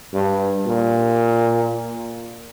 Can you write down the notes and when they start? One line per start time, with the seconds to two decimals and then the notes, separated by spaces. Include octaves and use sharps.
0.14 G2
0.67 A#2